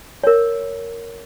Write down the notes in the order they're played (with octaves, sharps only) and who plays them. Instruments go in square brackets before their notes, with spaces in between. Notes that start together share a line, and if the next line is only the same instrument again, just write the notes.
[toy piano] A#4 C#5